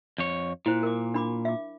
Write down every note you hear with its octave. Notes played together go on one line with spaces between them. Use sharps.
F2 C#5
A#2 E4 C5
A#4 D6
D4 B5 D6
E5 D6